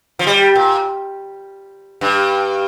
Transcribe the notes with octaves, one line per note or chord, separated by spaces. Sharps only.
F3
G3
A#2
G2